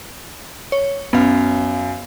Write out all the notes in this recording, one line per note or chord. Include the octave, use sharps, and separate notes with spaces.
C#5
F#2 B3 F5